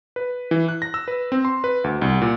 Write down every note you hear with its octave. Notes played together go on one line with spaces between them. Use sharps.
B4
E3
F#6
A#6
E6
B4
C4
C6
B4
D2
C2
A#2